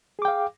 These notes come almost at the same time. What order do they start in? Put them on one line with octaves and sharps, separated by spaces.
G#4 D6 G5 F5